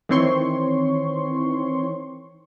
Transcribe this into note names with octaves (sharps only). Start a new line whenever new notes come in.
D#3 E3 C4 C#5 C6 C#6